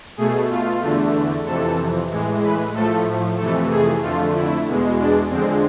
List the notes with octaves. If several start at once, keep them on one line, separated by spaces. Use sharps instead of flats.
B2 A3 G#4
F4
E2 D3 A3
F2 C3 E3 A4
A2 E3 G#3
B4
A2 F3 A3 A4
F2 C3 E3 A3 A4
G#4
F2 D3 A3 F4
E4
E2 B2 G#3
D4
F2 D3 G#3 C4